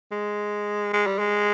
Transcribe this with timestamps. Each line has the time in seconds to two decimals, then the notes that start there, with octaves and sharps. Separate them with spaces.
0.12 G#3
0.93 G#3
1.07 G3
1.19 G#3